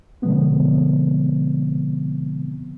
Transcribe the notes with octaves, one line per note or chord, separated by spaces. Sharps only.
B2 D3 F3 G#3 B3 C4